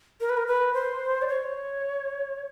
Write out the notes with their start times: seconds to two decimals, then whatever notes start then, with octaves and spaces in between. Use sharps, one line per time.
0.21 A#4
0.29 B4
0.37 A#4
0.47 B4
0.74 C5
1.22 D5
1.28 C#5